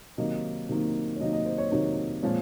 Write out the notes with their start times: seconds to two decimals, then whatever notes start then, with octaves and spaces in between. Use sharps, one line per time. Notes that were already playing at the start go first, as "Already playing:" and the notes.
0.18 C3 D#3 F#3 A#3 D#4 D#5
0.69 C3 D#3 F#3 A#3 D#4
1.16 C#5
1.20 C3 D#3 F#3 A#3 D#4 D#5
1.33 D#5
1.46 C5
1.58 C#5
1.71 C3 D#3 F#3 A#3 D#4 C#5
2.22 A#2 F3 G#3 C4 C#5